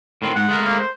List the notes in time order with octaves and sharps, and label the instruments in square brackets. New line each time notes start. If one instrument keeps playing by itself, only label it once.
[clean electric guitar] A2 D#3 C4
[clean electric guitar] G#2 [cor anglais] F#5
[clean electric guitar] G#3 A3 A#4
[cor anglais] A#3
C5